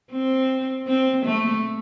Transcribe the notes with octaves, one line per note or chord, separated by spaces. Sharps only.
C4
C4
A3